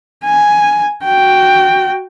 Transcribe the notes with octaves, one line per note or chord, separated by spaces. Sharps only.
G#5
F#4 G5